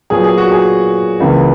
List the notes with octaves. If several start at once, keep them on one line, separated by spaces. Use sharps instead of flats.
A#2 F#3 B3 G#4
G#4
F#4
G#4
C#2 C#3 E3 A#3